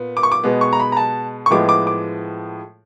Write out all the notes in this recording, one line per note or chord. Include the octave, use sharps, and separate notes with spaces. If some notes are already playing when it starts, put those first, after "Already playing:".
Already playing: A#2 B3
D6
C#6
D6
B2 G#3 B3
C#6
A#5
B5
A#5
A5
C#6
A2 F3 G#3 B3 D6
D6
D6